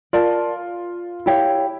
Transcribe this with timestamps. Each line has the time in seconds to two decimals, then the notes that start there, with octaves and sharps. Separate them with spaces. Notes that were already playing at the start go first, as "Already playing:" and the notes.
0.13 F4 A#4 D5 A5
1.26 E4 G4 C#5 F5